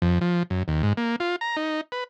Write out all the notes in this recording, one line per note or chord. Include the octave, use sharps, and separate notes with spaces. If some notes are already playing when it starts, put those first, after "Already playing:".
F2
F3
F#2
D#2
G#2
A#3
F4
A#5
D#4
B4